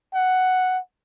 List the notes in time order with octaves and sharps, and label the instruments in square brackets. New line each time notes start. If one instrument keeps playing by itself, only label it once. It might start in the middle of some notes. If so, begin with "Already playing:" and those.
[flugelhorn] F#5